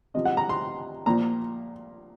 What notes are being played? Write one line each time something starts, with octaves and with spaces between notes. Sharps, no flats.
C3 F3 D#5
F#5
A#5
C6
A#2 F3 A#5